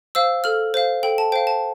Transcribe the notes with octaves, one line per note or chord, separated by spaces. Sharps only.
C5 F5 E6
A4 F6
C5 F5
A4 G5
A5
C5 F5 G5
A5